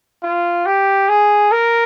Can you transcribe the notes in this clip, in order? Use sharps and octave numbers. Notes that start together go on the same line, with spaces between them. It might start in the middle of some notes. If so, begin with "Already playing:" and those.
F4
G4
G#4
A#4